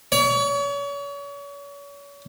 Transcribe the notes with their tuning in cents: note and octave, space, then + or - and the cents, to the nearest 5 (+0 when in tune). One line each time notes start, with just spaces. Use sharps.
C#5 +35